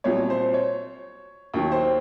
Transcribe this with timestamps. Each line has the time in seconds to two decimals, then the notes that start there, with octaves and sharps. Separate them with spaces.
0.04 C2 A#2 F#3 C#5
0.30 C5
0.54 C#5
1.54 D#2 D#3 F#3
1.72 C5